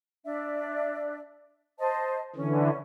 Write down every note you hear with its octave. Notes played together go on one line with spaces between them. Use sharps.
D4 D5 E5
C5 D#5 A5
D3 E3 C#4